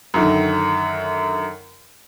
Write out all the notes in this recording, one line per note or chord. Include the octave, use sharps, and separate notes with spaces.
F#2 D3 D#3